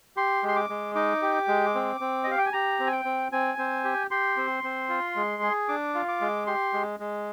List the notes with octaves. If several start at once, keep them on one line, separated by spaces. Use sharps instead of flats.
G4 C6
G#3
C6
D6
G#3
D#4 D6
G4
G#3
C4
C4
D#5
G4 F5
G5
G#5
G4 A#5
C4
G#5
G5
C4
C4 G#5
C4
G4
G4 C6
C4
C4
F4
G#3
G#4
D4 D6
F4
D6
G#3
G4 C6
G#3
G#3